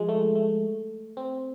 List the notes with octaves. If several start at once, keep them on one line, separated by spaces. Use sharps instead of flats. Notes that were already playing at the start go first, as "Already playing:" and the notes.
Already playing: F3 G#3
A3
A3
C4